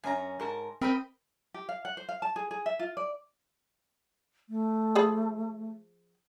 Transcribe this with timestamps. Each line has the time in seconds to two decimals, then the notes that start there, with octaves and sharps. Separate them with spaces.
0.04 F#2 C#4 G#5 A#5
0.40 G#2 A#4 A5
0.81 C4 A#4 C5 D#5 B5
1.54 G4
1.69 F5
1.85 F#5
1.97 C5
2.09 F5
2.22 A5
2.36 G#4
2.51 G#4
2.66 E5
2.79 F4
2.97 D5
4.49 A3
4.95 F3 G#4 B5